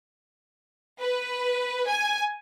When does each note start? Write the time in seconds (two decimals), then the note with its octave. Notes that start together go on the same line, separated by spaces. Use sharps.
1.01 B4
1.89 G#5